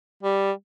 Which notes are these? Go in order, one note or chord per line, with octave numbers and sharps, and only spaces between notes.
G3